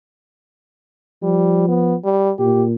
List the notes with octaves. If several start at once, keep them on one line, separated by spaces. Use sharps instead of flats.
F3 G3
B3
G3
A#2 G4